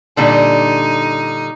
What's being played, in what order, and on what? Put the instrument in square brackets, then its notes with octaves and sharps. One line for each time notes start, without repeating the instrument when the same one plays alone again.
[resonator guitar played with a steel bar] A#2 D3 G3 [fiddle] D#4